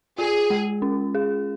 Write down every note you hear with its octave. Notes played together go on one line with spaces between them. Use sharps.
F4 G#4
G#3
C#4
G#4